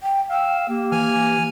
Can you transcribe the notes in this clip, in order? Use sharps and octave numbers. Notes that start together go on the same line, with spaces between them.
G5
F5 G5 E6
A#3 G4
E3 G#5 F6